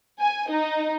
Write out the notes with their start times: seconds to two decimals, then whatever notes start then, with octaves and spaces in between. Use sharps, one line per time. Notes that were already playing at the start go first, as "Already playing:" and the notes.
0.20 G#5
0.51 D#4